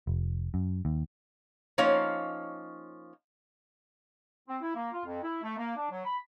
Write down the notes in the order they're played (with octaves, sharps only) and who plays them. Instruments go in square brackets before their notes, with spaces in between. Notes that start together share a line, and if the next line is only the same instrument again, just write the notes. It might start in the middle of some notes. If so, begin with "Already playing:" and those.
[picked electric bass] F1
F#2
D#2
[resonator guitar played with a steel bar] F3 A#3 C#4 D#4 C#5 F5
[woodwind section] C4
E4
A#3
F4
F2
E4
A3
A#3
D4
F#3
B5